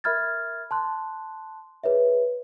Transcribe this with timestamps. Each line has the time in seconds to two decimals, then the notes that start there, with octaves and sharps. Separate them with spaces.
0.04 A#4 E5 B5 F6 G#6 A6
0.71 A5 C6 F#6
1.84 G#4 B4 C#5 E5